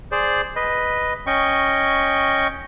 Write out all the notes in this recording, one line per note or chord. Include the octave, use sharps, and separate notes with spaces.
G#4 C5 D5
B4 D#5
C#4 D#5 G5 C#6